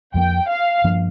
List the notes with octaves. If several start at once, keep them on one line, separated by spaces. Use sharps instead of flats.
F2 F3 A#3 G5
F5
G2 F3 A#3 D4